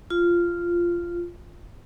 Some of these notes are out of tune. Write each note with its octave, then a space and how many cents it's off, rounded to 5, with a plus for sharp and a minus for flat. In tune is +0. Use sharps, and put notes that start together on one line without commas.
F4 -10